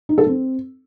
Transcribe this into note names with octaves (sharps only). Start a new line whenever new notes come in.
D#4
A4
C4